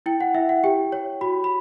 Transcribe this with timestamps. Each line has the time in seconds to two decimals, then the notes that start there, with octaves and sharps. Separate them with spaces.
0.06 E4 G5
0.20 F#5
0.35 E4 E5
0.49 F#5
0.64 G4 G5
0.92 C#5
1.21 F#4 B5
1.44 B5